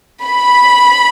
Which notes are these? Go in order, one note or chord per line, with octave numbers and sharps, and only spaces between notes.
B5